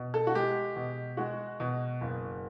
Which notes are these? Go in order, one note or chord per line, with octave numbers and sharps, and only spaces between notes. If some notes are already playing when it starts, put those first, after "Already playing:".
Already playing: B2
A4
F#4
G#3 G4
B2
G#3 F#4
B2
F#1